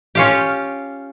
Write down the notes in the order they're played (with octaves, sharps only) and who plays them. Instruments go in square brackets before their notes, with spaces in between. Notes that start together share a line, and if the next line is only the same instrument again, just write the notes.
[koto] C#4 F4 G4